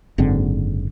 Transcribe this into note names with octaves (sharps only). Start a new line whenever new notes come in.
F#1 G#2 D3 C4